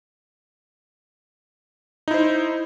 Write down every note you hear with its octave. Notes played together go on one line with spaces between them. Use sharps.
D#4 E4 C5